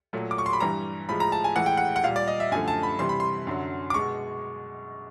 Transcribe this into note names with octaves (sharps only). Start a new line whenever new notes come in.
A#2 F#3 A3
D6
C#6
C6
B5
G2 E3 G3 A#5
A2 F3 G#3 B5
A#5
A5
G#5
A2 E3 G#3 F#5
G5
F#5
F#5
A#2 G3 F5
D5
D#5
E5
F#2 D3 F3 A3 G#5
A5
B5
C3 E3 G3 C6
B5
C6
F#2 D3 F#3
D6
B2 G#3 C#6